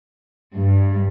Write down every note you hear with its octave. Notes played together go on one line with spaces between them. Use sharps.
G2